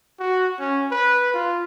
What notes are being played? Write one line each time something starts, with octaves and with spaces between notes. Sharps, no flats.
F#4
C#4
B4
F4